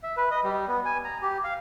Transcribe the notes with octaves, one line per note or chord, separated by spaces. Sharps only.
E5
B4
D#5
G3
B3
G#5
A#5
G4
F5